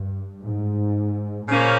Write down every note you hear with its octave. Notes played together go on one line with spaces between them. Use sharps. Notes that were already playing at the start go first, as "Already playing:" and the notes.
Already playing: G2
G#2
A#2 C#3 F3 A#3 C#4